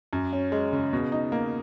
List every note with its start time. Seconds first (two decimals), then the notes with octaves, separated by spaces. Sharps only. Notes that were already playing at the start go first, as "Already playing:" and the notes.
0.13 F#2
0.33 C#4
0.52 G#3
0.73 C#3
0.93 B2
1.12 D#4
1.32 A#3